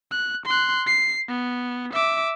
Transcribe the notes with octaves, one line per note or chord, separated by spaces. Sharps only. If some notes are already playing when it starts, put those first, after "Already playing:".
F#6
C6 F#6
C7
B3
E5 D6